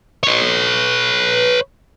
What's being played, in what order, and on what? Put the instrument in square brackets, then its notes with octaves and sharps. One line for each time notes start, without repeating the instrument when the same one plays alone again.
[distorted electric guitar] B4 C#5